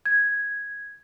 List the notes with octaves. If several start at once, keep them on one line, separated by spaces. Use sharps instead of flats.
G#6